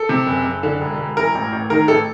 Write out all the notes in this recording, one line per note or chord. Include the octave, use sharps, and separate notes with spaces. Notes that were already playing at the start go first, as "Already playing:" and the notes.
Already playing: A4
C3
F#1
F#1
D3
E1
E1
E3 A#4
A1
A1
D#3 A#4
A1 A4